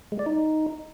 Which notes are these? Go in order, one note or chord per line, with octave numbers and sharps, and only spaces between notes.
G#3
D5
D#4